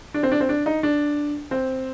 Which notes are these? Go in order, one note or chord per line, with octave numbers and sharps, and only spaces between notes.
D4
C4
D4
C4
D4
D#4
D4
C4